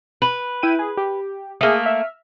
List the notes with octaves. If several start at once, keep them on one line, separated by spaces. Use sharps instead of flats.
B4
E4 G5 D#7
G#4
G4
A3 A#3 G#4 D#6
E5 F6